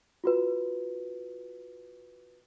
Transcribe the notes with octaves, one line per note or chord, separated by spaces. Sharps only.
F4 F#4 B4